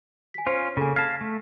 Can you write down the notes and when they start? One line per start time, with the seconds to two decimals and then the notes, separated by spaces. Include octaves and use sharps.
0.34 G#5 B6
0.47 C#4 F4 C5
0.77 C#3 A#3 A4 G#5
0.96 F5 A5 G#6 A#6 B6
1.21 A3